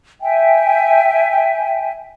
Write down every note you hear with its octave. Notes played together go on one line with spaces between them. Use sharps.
E5 G5 G#5